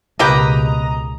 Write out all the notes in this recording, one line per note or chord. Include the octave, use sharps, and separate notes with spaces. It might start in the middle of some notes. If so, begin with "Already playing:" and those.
C#2 B2 A#3 G4 B4 D#5 A#5 D#6